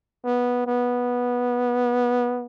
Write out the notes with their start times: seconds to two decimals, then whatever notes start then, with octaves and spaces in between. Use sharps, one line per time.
0.25 B3
0.67 B3